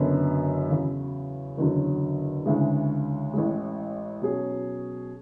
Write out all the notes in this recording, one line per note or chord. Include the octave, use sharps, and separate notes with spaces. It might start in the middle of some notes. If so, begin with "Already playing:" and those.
Already playing: F#1 F#2 D3 F#3 B3
E2 C#3 F#3
F#1 E2 D3 F#3
D2 C#3 E3 G#3
A1 A2 G#3
B2 F#3 C#4 G#4